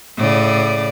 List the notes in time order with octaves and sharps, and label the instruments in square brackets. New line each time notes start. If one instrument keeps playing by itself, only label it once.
[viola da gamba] A2 C#3 D5